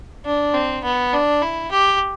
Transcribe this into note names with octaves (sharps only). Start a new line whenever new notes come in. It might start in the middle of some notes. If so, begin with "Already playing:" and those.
D4
C4
B3
D4
E4
G4